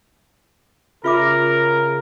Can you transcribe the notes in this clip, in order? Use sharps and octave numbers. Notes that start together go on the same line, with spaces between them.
C#3 F4 A#4 E5 D6